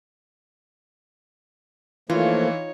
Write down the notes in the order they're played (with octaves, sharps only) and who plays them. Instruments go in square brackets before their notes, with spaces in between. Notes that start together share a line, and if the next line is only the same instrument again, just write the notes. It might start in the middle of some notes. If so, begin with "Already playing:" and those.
[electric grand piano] E3 [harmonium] F3 A3 A#3 [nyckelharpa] D#4 C#5 [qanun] F4